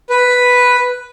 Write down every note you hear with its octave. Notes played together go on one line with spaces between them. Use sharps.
B4